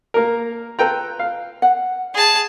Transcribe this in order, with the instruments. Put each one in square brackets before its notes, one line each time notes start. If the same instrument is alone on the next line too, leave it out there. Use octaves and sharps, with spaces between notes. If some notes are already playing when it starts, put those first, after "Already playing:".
[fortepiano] A#3 A#4
[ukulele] F4 B4 [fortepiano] A4 G5 A#5
[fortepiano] F5
[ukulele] F#5
[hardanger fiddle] G#4 A5